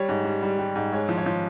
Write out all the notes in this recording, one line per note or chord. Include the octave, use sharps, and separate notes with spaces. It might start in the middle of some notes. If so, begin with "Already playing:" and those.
Already playing: G3 C#5
G#2
G3
G3
G3
G#2
G#3 C#5
F3
C#5
F3